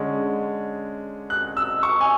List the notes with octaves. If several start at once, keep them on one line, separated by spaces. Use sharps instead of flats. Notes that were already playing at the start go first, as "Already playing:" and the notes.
Already playing: D3 G#3 C#4
F#6
E6
C#6
G#5